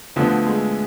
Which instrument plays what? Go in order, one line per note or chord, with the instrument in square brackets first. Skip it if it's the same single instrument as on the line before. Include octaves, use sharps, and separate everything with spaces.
[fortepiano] D2 D3 F3 B3 [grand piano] A3
[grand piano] G#3